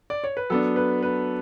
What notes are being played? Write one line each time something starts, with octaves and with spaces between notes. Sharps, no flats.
D5
C#5
B4
F#3 B3 D4 A4
B4
B4